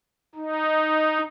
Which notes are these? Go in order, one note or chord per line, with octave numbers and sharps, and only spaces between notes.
D#4